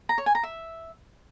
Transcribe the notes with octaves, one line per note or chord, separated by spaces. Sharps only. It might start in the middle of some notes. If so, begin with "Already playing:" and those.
A#5
C#5
G#5
A#5
E5